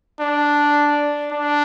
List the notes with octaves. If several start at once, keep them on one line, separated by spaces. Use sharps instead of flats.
D4
D4